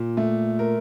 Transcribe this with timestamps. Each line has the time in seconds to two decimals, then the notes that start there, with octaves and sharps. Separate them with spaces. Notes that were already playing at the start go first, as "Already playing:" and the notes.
Already playing: A#2
0.17 A3
0.59 A#4